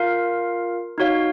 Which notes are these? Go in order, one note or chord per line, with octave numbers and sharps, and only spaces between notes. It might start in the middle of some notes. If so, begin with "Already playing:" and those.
Already playing: F4 A#4 F5
D#4 F#4 C#5 F5